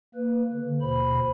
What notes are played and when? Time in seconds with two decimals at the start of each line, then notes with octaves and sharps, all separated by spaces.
0.15 A#3 B4
0.52 D3
0.81 D#2 B2 C5 B5